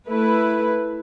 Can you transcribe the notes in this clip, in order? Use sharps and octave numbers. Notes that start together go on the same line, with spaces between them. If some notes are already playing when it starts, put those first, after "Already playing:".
A3 E4 B4